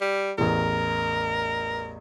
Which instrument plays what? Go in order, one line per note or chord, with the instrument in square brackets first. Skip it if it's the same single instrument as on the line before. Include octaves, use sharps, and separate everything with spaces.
[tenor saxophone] G3
[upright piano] A1 E2 [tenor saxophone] A#4